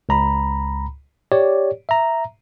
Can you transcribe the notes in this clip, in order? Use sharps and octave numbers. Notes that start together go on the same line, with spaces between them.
C#2 A#5 B5
G4 C#5 D5
E5 A#5